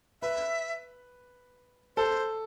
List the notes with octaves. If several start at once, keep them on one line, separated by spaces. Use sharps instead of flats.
B4 E5
A4 C5